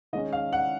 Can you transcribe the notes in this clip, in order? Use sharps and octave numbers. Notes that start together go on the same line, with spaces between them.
D#3 G#3 C#4 D#5
F5
F#5